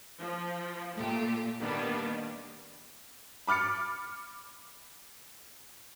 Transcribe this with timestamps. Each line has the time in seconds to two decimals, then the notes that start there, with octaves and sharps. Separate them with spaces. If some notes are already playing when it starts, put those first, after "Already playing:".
0.19 F3
0.96 A#2 A3 G4
1.61 D#3 G3 A#3 B3 D4
3.47 B5 D6 F6 A6 C#7